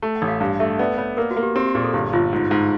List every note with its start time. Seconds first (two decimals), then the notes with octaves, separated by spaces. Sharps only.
0.02 A3
0.16 F#5
0.22 A1
0.28 F5
0.40 G2 F5
0.59 A3 E5
0.79 B3 D5
0.98 B3 C#5
1.17 A#3 A#4
1.31 F#4
1.36 A#3
1.43 G4
1.56 C4 G4
1.66 G4
1.75 A#2 G#4
1.84 A4
1.93 G1 G4
2.13 G1 F4
2.33 G#2
2.51 G#2